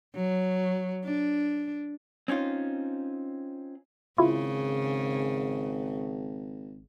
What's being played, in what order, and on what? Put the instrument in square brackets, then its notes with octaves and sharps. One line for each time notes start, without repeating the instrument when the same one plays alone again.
[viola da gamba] F#3
D4
[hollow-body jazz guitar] C4 C#4 D#4 F4
[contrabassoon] G#1 [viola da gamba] C#3 [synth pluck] E4 F4